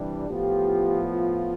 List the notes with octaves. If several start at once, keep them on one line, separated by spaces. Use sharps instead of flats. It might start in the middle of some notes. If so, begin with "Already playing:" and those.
Already playing: C3 E3 G3 D4
A2 F3 B3 F4 G4
F4